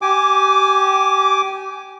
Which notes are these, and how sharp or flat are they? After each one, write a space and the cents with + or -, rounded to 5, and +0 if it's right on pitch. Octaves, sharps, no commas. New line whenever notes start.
G4 -25 G#5 +0 D6 +0